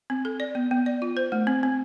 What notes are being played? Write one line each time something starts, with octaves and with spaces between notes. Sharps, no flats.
C4
A4
D5
B3
B3
D5
F4
C5
A3
C4
C4